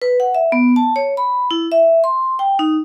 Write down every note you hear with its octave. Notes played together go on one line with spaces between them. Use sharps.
B4
F#5
E5
B3
A5
C#5
B5
E4
E5
C6
G5
D#4